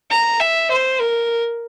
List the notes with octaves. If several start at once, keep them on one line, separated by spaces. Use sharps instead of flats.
A#5
E5
C5
A#4